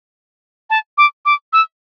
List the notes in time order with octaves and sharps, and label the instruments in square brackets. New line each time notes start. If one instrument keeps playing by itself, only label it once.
[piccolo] A5
D6
D6
E6